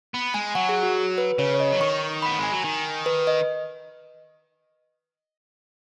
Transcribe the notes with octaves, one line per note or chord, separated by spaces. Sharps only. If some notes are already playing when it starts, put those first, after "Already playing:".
B3
G#3 G#5
F#3 F#5
G#4
F#4
B4
C#3 C#5
C#5
D#5
F#3
D#3 C#6
B3 B5
G#3 G#5
F#3
D#3
B4
D#5